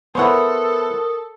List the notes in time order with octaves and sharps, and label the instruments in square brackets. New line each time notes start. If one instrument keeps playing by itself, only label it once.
[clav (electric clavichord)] B3 E4 [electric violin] A4 [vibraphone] A#4 D#6 [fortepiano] C5 C#5 F#5